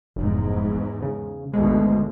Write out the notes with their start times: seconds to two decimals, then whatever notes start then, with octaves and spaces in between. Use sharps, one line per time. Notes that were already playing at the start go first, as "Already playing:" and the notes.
0.16 F1 E2 G#2
1.02 C#3
1.54 G#1 D2 B2 G#3